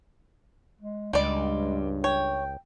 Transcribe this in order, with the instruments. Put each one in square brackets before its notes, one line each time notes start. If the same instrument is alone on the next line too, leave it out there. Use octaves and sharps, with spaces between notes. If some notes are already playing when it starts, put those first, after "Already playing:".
[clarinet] G#3
[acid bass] C#2 [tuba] G2 [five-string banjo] G3 D5 [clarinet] G#3
[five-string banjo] C#5 [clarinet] G5